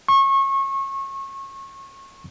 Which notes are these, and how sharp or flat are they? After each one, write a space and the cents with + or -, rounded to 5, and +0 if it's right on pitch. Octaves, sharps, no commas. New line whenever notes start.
C#6 -25